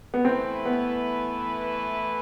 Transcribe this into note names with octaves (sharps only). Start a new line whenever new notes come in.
B3
E3 A3 C4 E4 B4
B3